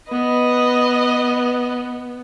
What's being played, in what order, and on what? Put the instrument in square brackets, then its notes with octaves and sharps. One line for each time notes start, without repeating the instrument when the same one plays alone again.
[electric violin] B3 [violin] B4 D#5